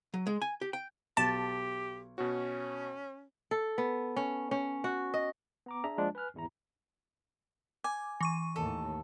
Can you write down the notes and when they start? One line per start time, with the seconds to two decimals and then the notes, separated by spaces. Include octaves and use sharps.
0.14 F#3
0.27 G#3
0.42 G#5
0.61 G4
0.73 G5
1.17 B1 G4 A5
2.18 B2 C#4 F#4
3.51 A4
3.78 B3
4.16 C#4
4.51 C#4
4.84 F#4
5.14 D#5
5.66 B3 A#5 D6
5.84 D4 G#4 E5 A#5
5.98 F3 G#3 A#3 D4 F4
6.15 B4 G#5 F6 F#6
6.34 G#1 E2 E4 A#5
7.84 G#5 D6
8.21 E3 C#6 D#7
8.56 D#2 A2 A4